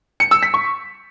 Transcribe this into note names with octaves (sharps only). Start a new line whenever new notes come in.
C#7
E6
B6
C#6